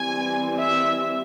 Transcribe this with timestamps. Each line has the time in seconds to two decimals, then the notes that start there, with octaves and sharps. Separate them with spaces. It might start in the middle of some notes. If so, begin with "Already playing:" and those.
Already playing: E3 G3 C4 G#5
0.57 E5